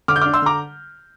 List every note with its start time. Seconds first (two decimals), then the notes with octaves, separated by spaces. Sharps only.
0.08 D3 D6 F6
0.16 G6
0.21 D4 D6 F6
0.33 C6 E6
0.42 D3 A#5 D6